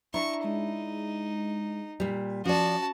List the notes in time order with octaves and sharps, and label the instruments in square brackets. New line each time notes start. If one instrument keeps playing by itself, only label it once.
[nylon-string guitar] D4 E4 [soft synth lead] A#5 [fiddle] C#6
[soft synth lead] G#3 [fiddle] D#4
[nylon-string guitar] A#2 G3
[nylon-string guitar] F3 D5 [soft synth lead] C#4 [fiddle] F#4 A5